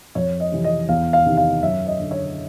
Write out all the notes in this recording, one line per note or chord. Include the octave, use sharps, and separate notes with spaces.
F2 C#5
D#5
C3 E3
D#5
E2 F5
F5
C3 D#3
F5
F#2 E5
D#5
D3
C#5